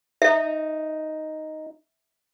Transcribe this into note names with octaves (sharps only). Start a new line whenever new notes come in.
D#4 E5